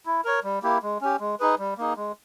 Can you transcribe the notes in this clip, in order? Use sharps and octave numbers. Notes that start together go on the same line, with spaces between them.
E4
A#4 C#5
G3
A#3 E4 G4
G#3
C#4 G4
G#3
D#4 G#4 B4
G3
A#3 D#4 G#4
G#3